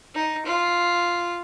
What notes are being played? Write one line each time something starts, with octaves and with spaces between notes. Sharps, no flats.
D#4
F4